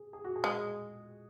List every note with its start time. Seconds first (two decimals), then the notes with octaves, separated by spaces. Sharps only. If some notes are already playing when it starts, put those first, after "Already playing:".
Already playing: G#4
0.13 G#4
0.24 F#4
0.36 G#4
0.44 G#3